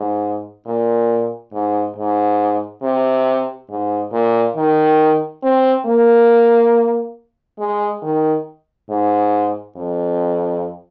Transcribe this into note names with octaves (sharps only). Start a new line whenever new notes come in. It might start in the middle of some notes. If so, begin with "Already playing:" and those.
Already playing: G#2
A#2
G#2
G#2
C3
G#2
A#2
D#3
C4
A#3
G#3
D#3
G#2
F2